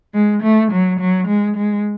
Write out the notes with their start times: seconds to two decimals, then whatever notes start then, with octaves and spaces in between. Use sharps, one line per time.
0.14 G#3
0.43 A3
0.72 F#3
1.00 F#3
1.28 G#3
1.57 G#3